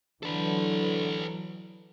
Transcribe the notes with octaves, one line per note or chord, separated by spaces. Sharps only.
D3 E3 F#3 A4 B4